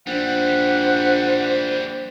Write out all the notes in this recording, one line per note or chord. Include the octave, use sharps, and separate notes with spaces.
A#1 E3 G3 C5 F#5